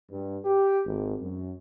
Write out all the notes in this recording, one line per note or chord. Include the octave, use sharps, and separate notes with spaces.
G2
G4
G#1
F#2